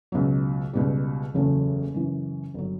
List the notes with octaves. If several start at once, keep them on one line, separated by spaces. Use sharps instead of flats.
C#2 B2 F#3
C#2 B2 G3
F#1 E2 C#3 F#3 A3
F#2 C#3 E3
G1 F#3